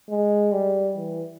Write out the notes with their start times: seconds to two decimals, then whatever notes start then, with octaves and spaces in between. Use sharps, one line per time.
0.10 G#3
0.52 G3
0.97 E3